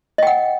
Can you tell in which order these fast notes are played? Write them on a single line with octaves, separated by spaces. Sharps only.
D#5 G5 F#5